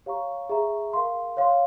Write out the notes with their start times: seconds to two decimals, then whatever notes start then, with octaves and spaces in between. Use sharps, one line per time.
0.06 G4 C#5 F5 A#5 C#6
0.49 G#4 E5 A#5 C#6
0.93 A#4 F5 C6
1.37 C#5 F5 C6